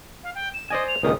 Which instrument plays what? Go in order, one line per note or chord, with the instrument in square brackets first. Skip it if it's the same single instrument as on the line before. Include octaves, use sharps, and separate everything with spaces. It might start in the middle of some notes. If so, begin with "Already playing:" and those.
[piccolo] F5
G5
E7
[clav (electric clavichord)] C5 D5 G#5 [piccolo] D#5
[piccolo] F7
[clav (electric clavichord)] C#2 A#2 D#3 [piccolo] D#6